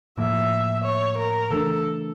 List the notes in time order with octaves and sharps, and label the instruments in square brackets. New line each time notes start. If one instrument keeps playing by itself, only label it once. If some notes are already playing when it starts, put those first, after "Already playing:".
[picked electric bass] A2 F3 A#3 [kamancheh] E5
[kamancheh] C#5
A#4
[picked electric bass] C#3 E3 A3 D4 [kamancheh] A4